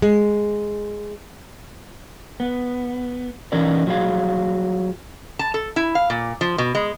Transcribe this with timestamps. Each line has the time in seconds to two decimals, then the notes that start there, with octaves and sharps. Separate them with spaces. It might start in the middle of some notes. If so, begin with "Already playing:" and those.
0.02 G#3
2.40 B3
3.52 E3 C#4 D#4 A#4 D5
3.87 F#3 G3 F4 G#4 F5
5.39 A5
5.54 A4
5.76 E4
5.95 F5
6.10 A#2
6.41 F3
6.58 B2
6.75 G#3